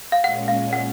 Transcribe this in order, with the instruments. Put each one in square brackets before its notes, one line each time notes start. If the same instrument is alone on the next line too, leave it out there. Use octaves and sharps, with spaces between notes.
[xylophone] F5
[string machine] A#2 G#3 C#4 [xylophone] F#5
[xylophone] F5
F#5